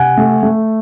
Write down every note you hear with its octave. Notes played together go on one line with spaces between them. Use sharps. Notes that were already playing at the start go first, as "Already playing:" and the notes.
Already playing: C3 F#5 G#5
A3
A3